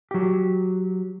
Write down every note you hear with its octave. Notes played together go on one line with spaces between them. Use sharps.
F#3 G4